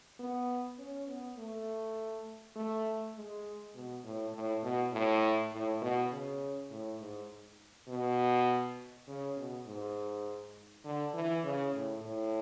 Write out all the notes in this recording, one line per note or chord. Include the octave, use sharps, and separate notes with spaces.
B3
C#4
B3
A3
A3
G#3
B2
A2
A2
B2
A2
A2
B2
C#3
A2
G#2
B2
C#3
B2
G#2
D3
E3
C#3
A2
A2